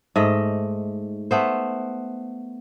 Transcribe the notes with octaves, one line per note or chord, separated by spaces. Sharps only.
G#2 A3 D#5
A3 B3 C5